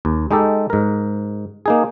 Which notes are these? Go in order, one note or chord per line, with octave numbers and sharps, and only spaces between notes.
D#2
G#3 D#4 G4 A4
G#2 A#4
A#3 D#4 G#4